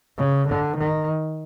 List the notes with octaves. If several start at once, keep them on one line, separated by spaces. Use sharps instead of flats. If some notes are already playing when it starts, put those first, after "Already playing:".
C#3
D3
D#3